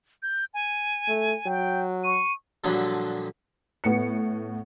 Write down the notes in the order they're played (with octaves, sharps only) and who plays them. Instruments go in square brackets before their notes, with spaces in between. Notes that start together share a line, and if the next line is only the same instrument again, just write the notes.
[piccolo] G6
G#5
[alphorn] A3
[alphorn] F#3 [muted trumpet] G5
[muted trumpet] C#6 [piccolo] D#7
[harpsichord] G2 A#2 D3 F3 F#3
[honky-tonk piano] A2 B3 C#7